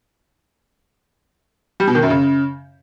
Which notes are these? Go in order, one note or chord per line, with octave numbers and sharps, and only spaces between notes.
G3
B2
D#3
F#2
C#3